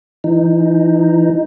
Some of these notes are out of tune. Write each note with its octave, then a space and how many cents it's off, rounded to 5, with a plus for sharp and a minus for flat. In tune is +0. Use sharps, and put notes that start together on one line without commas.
E3 +25 D#4 +0